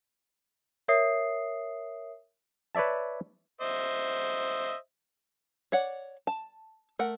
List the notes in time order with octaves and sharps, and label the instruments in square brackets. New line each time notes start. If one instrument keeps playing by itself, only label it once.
[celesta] A#4 C#5 E5 D#6 C7
[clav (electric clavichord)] B4 C#5 D5 E5 A5
[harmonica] C5 D#5 E5
[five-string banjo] C#5 D5 F#5
A5
A3 A#4 F#5